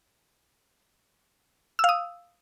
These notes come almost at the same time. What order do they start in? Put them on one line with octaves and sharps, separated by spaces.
E6 F5 D#6